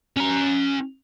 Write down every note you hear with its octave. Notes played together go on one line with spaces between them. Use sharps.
C#4 A#5